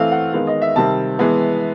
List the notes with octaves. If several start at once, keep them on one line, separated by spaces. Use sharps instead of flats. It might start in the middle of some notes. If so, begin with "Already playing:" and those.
Already playing: E3 A3 C4 F5
F#5
D#3 G#3 B3 F5
D#5
E5
C3 D#3 G3 C4 A5
E3 G#3 B3